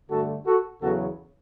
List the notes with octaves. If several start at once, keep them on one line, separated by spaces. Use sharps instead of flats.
G2 D3 A3 F#4 A4
F#4 A4
E2 C#3 F#3 B3 F#4 A4